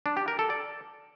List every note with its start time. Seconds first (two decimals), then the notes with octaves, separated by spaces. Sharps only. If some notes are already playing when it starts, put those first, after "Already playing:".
0.06 D4
0.17 G4
0.28 A#4
0.39 A4
0.50 D5